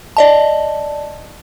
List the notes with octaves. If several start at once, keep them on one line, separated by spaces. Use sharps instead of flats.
D5 D#5 A5